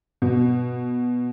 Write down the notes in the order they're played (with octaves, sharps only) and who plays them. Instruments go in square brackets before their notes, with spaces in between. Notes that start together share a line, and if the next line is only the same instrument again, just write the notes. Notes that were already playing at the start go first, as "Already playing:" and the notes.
[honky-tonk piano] B2